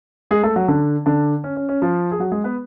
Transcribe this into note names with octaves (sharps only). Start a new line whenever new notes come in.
G#3 G#4
A3 A4
F#3 F#4
D3 D4
D3 D4
C#4
C#4
C#4
F3 F4
G#4
F#3 F#4
G#3 G#4
B3 B4